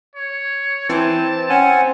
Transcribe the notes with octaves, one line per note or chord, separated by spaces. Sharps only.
C#5
E3 C4 A5
C#4 F#5 G#5